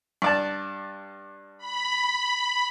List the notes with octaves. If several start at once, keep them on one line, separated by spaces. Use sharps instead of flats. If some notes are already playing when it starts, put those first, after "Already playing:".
G2 D5 A5
B5